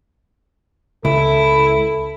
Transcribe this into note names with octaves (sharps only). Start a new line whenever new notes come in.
C#2 E4 A4